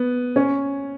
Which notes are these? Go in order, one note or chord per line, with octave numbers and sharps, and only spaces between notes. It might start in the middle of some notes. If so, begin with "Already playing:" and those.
Already playing: B3
C#4